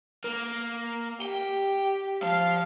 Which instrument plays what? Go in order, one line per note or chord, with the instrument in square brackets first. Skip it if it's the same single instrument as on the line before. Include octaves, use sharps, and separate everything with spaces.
[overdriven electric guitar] A#3
[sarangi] G4 [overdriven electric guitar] G5
[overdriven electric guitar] F3 [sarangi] F5